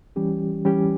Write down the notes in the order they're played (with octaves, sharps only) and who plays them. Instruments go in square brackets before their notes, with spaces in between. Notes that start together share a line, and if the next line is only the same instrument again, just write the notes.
[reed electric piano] E3 G3 C#4 G4
E3 G3 C#4 G4